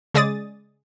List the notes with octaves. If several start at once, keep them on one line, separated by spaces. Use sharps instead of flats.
C#3 G#3 G#4 D5 D#6 A6